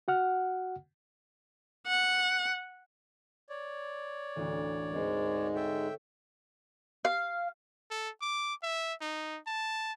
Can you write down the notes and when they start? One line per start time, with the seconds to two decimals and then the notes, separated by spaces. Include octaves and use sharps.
0.08 F#4 F#5 F6
1.87 F#5
3.50 C#5 D5
4.36 A1 D2
4.92 G#2 G#3 C4 A#4
5.55 A4 C#5 E5 G5
7.05 F5
7.91 A4
8.21 D6
8.63 E5
9.01 D#4
9.47 A5